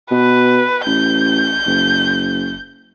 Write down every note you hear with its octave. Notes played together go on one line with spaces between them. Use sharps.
B2 B4
A1 G6
F#1